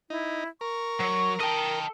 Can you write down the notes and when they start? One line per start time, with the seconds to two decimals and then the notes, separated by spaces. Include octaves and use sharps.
0.10 D#4 E4
0.61 A#4 C#6
1.00 F#3 C#5
1.40 A4 D#5 G5